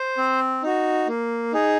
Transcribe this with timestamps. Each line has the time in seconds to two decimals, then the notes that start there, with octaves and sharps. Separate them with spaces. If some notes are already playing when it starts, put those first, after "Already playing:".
Already playing: C5
0.18 C4
0.63 D#4 F#4
1.07 A#3
1.53 D#4 G#4